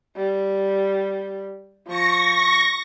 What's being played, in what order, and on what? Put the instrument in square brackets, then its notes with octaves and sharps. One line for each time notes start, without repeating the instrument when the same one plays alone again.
[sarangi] G3
[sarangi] F3 [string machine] C#6 A#6